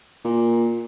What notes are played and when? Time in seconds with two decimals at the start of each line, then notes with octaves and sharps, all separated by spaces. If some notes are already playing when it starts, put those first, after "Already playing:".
0.25 A#2